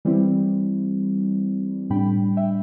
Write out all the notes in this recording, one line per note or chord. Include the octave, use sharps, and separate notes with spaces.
E3 G3 C4 E4
A2 G3 D4 G5 B5
E5 G5